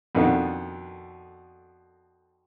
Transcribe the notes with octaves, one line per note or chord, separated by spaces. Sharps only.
F2 B2 D#3 D4 A4 F#5